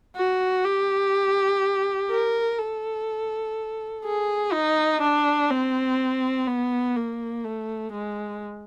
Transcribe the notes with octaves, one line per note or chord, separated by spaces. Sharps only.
F#4
G4
A#4
A4
G#4
D#4
D4
C4
B3
A#3
A3
G#3